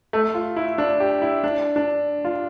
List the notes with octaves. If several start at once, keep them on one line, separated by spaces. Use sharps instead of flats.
A3
F4
E4
D4
G4
E4
D4
D4
F4